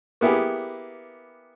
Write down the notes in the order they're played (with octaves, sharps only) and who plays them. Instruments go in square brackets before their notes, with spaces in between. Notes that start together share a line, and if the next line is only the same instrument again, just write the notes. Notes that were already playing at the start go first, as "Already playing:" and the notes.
[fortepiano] A#3 B3 E4 G4 G#4